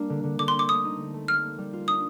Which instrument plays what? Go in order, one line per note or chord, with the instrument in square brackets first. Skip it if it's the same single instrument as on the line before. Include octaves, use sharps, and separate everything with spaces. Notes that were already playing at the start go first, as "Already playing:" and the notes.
Already playing: [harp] G3 A#3 D4
D3
D3
[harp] D3 [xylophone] D6
[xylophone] C6
[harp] C4
[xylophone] D6
[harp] A3 [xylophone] D#6
[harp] D#4
A3
A3
[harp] G3 [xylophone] F6
[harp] A#3
G3
F4
[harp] D4 [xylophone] D#6